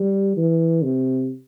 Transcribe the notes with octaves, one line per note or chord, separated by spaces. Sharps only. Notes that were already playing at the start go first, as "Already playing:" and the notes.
Already playing: G3
E3
C3